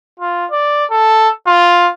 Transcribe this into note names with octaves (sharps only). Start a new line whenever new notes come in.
F4
D5
A4
F4